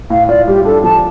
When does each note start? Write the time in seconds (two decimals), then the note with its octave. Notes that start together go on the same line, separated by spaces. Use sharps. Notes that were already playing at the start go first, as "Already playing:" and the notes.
0.10 A2 F5
0.29 F4 D5
0.47 G3 G4
0.65 D4 A4
0.84 F3 A5